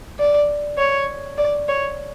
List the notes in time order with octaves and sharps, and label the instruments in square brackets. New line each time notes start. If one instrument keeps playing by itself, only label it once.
[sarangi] D5
C#5
D5
C#5